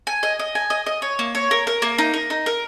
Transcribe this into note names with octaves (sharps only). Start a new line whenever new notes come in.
G#5
D#5
D#5
G#5
D#5
D#5
C#5
A#3
C#5
A#4
A#4
A#3
D#4
A#4
D#4
A#4